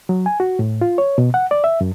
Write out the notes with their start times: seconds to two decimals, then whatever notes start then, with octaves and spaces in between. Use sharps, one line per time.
0.09 F#3
0.26 G#5
0.40 F#4
0.59 A2
0.81 F4
0.98 C#5
1.18 B2
1.34 F#5
1.51 D5
1.64 E5
1.81 F#2